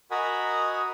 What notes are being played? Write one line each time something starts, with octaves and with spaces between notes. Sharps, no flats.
F#4 A#4 D#5 F#5 G#5 B5